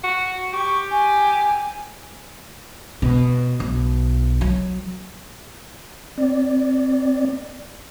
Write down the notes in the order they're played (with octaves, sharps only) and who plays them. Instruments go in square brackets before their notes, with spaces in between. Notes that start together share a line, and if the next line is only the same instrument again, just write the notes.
[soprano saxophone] F#4
[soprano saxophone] G4 [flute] C#6
[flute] G#5
[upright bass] B2
B1
F#3
[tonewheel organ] C4 D5